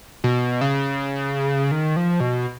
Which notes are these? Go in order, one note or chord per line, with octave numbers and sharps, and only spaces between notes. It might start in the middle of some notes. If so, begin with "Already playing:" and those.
B2
C#3
D#3
F3
B2